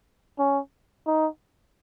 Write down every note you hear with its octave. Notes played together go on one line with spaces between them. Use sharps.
C#4
D#4